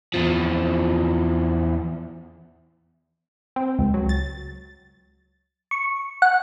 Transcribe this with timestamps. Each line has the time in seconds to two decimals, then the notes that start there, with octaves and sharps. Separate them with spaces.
0.14 E2 F3
3.56 C4
3.79 C#2
3.94 F#3
4.09 A6
5.71 C#6
6.22 F#5